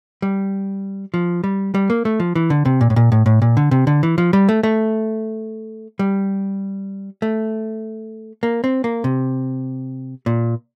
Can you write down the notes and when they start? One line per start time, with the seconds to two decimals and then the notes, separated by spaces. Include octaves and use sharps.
0.22 G3
1.14 F3
1.44 G3
1.75 G3
1.90 A#3
2.05 A3
2.20 F3
2.35 E3
2.50 D3
2.65 C3
2.81 A#2
2.90 A2
2.96 A#2
3.12 A2
3.26 A2
3.42 A#2
3.57 D3
3.71 C3
3.87 D3
4.03 E3
4.18 F3
4.33 G3
4.49 A3
4.63 A3
5.99 G3
7.22 A3
8.43 A#3
8.64 C4
8.84 A#3
9.04 C3
10.26 A#2